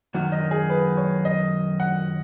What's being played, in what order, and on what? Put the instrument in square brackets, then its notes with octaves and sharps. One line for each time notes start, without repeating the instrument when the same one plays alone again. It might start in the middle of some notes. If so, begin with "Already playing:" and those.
[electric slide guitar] F#2 D#3 F#3 [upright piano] F#5
[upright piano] D#5
G#4
B4
C#5
D#5
F#5